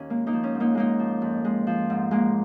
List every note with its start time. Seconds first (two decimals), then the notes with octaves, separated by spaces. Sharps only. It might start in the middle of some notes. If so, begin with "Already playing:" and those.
Already playing: D#2 D#3 C#4
0.10 G#3 A#3
0.27 A#3 D#4
0.33 F3
0.44 C#4
0.55 G#2
0.60 A#3 D#4
0.75 G#3 A#3 D#4
0.99 F3
1.22 F2
1.45 G#3
1.67 F3
1.90 G#2
2.11 G#3 A#3